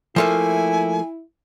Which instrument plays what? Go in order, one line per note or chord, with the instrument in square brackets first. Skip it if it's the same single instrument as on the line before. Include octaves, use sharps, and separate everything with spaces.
[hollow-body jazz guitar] F3 A3 A#3 [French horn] E4 [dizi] G#5